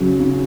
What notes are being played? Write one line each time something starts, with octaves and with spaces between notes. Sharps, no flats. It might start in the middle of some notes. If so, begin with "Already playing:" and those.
Already playing: C#3 F#3
C#3